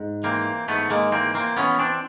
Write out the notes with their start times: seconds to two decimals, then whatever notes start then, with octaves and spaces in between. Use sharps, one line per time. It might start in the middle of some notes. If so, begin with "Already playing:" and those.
Already playing: G#2
0.23 E3 A#3 C4
0.68 G#2 A3 B3
0.90 G#3 A#3
1.12 E3 A#3 C4
1.34 A#3 C4
1.57 E3 B3 C#4
1.79 C4 D4